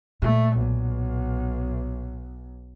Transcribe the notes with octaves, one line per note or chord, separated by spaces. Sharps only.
A#2 A3
B1